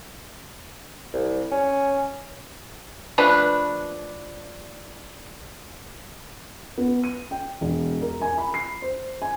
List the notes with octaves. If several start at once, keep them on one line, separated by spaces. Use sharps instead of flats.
C2
C#4
F3 A3 D4 B4
B3
D#7
G5
E1
A#4
G#5
B5
C7
C5
G#5